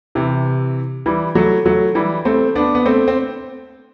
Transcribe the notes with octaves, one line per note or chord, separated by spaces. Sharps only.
C3 E3
E3 G3
F#3 A3
F#3 A3
E3 G3
A3 C4
B3 D4
B3
A3 C4
C4